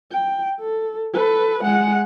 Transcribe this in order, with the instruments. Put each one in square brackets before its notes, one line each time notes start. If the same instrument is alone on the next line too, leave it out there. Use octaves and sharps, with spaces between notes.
[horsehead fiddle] G5
A4
A4 B4
G#3 F#5